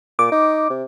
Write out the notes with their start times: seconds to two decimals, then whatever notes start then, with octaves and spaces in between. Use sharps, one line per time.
0.19 A#2 D6
0.32 D#4
0.70 C3